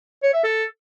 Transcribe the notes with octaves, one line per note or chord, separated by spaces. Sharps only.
C#5
E5
A4